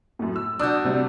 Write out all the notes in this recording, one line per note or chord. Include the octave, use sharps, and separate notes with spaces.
F#2 A2
E6
D4 F#4 D6 D#6 G6
C3 G3